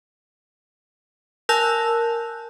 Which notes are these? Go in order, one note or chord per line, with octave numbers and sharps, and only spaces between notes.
A#4 G#5 A5 E6 F#6 G6